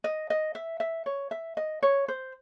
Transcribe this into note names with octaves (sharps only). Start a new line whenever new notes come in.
D#5
D#5
E5
E5
C#5
E5
D#5
C#5
C5